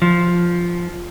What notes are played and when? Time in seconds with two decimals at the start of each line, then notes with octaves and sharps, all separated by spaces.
0.02 F3